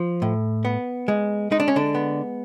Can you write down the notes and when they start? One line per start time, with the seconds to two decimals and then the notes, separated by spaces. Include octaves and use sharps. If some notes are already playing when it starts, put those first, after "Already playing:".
Already playing: F3
0.22 A2
0.65 B3
1.08 G#3
1.51 G#3 D#4
1.60 D4
1.68 C#4
1.76 D3 D4
1.95 B3